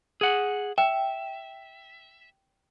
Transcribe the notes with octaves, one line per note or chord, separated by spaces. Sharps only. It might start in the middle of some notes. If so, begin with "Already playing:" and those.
G#4 F#5
E5 G5